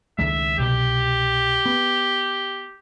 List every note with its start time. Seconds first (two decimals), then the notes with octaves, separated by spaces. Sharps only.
0.19 C#2 D#3 G#3 E5
0.58 C2 B2 G4
1.66 B3